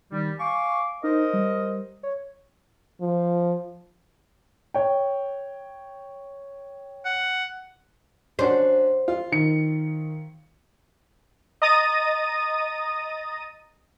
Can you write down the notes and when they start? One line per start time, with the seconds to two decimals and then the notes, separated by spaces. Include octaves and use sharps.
0.12 D#3 G3
0.39 F5 G#5 C#6 D6
1.04 D#4 A#4 C5 D#5
1.33 G3
2.03 C#5
3.00 F3
4.74 C#5 G5
7.05 F#5
8.39 C#4 D4 F#4 C5
9.08 F4
9.32 D#3 C#7
11.62 D#5 A#5 D#6 A6 A#6 D#7